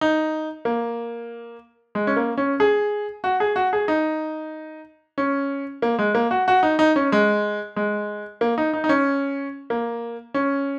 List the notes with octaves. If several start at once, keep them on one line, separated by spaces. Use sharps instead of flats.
D#4
A#3
G#3
C#4
A#3
C#4
G#4
F#4
G#4
F#4
G#4
D#4
C#4
A#3
G#3
A#3
F#4
F#4
D#4
D#4
C#4
G#3
G#3
A#3
D#4
D#4
D#4
C#4
A#3
C#4